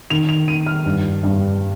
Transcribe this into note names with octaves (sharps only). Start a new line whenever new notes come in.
D#3 F7
F7
D#3 D#7
F6
G2
G2